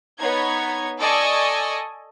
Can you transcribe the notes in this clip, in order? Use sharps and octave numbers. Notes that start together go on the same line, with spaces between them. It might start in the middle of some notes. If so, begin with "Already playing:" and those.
B3 D#4 C#5 G#6
A4 D5 D#5 G#5 C#6